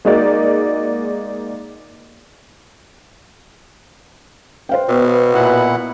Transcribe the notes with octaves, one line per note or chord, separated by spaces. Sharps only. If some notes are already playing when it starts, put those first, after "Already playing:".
G#3 A#3 D#4 F#4 D5
B4 C5 F5 G5
B2 B3
A#2 E4 F#5 B5